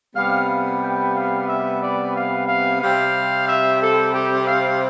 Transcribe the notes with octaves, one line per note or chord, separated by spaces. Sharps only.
C3 G3 B3 F5
F5
G5
F5
E5
D5
F5
F5
C3 G3 C4 F5
E5
A4
G4
F5